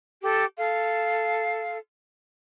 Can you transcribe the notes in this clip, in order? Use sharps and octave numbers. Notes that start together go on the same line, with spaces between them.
G4 A4
A4 F5